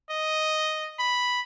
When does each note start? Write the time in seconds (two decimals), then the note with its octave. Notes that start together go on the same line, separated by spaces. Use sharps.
0.10 D#5
1.00 B5